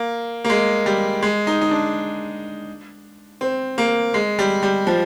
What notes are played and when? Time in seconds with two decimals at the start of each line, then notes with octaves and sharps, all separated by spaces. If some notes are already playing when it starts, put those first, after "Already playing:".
Already playing: A#3
0.45 A#3
0.50 G#3
0.86 G3
1.23 G#3
1.47 D#4
1.61 D#4
1.71 D4
3.41 C4
3.78 A#3
4.14 G#3
4.39 G3
4.63 G3
4.87 F3